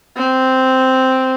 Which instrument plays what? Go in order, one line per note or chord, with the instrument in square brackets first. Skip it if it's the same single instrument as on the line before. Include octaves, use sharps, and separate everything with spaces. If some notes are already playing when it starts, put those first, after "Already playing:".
[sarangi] C4